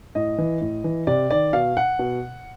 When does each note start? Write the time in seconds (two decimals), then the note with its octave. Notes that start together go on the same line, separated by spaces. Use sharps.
0.15 A2 D#5
0.38 E3
0.61 A2
0.84 E3
1.07 C3 D5
1.30 D#3 D5
1.53 B2 F5
1.77 F#5
1.99 B2